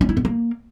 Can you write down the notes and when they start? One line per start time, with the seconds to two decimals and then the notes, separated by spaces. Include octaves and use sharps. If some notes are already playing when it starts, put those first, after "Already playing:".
0.01 C#4
0.09 E4
0.17 B3
0.25 A#3